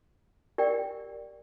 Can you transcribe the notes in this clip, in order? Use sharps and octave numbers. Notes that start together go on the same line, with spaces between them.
G4 A#4 D5 G5